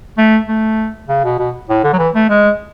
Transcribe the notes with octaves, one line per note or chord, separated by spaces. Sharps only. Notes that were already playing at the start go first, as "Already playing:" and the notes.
A3
A3
C#3
B2
B2
A2
D3
F#3
E3
A3
G#3